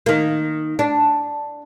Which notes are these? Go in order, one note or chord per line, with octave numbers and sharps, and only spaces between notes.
D#3 A#3
D4